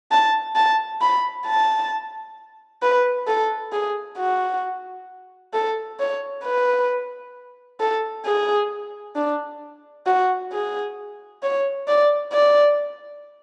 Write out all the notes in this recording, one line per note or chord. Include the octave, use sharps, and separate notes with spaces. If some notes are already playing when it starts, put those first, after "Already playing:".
A5
A5
B5
A5
B4
A4
G#4
F#4
A4
C#5
B4
A4
G#4
D4
F#4
G#4
C#5
D5
D5